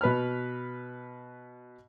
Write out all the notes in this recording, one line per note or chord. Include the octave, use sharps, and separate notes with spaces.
B2 B4 B5 F6